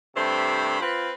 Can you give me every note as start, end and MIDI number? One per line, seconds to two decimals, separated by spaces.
0.16 0.78 43
0.16 0.78 48
0.16 0.78 57
0.16 0.78 72
0.16 0.78 83
0.80 1.11 60
0.80 1.11 65
0.80 1.11 71